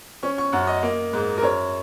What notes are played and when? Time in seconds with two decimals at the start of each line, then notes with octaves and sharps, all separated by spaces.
0.23 C#4 C#6
0.38 C#6
0.52 F#2 F#5
0.67 D#5
0.83 A#3
1.13 G#2
1.38 A#4
1.42 F#2 C#5